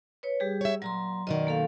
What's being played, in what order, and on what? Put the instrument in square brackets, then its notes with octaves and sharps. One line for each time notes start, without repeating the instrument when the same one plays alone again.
[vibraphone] B4 C#5
G3 G4 G#4
[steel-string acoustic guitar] C#5 E5
[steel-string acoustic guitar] A#2 [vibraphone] F#3 A#5 C6
[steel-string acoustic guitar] F#2 B2 D#3 [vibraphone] D5 D#5
[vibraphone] A#3 A4 F5